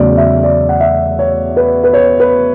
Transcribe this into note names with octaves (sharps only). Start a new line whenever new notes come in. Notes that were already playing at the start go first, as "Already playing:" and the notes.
Already playing: E2 C#3 F#3 A3 D5
E5
D5
F#5
E5
C#5
B4
B4
C#5
B4